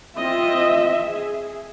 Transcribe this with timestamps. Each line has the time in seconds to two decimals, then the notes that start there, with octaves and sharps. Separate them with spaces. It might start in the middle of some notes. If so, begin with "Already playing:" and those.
0.18 C4 F4 D#5 E5
1.05 G#4